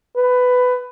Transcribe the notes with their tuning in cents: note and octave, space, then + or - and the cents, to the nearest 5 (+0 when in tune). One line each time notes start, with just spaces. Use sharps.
B4 +15